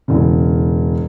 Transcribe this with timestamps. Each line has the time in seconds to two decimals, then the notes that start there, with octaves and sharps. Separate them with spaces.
0.08 E1 C#3